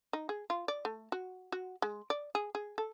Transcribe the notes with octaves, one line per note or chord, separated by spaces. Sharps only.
D#4
G#4
F4
D5
A3
F#4
F#4
G#3
D5
G#4
G#4
A4